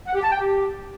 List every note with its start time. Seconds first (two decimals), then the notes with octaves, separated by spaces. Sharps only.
0.07 F#5
0.14 G4
0.22 A5
0.30 G5
0.38 G4